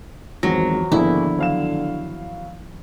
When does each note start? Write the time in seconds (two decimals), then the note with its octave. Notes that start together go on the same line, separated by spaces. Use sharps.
0.43 G#1 E2 F3 F#3 A#6
0.92 G#1 D3 D#3 F3 A#3 B3 E4 G#4
1.38 F#3 F5 E7